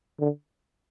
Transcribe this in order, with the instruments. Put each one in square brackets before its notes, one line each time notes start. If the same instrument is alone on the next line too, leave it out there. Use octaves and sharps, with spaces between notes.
[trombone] D3